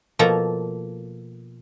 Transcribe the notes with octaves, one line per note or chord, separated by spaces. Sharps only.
B2 F3 A#3 A4 A#5